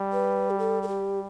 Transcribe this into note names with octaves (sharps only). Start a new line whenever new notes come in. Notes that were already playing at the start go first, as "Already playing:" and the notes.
Already playing: G3
B4
G4
A4
A4
G4